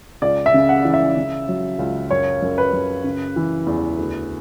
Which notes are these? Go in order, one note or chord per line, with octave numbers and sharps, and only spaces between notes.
C#2 D5
E5
C#3
F#5
E3
E5
C#3
F#3
C#2
F#2 C#5
F#2
B4
F#2
C#3
E3
E2
D2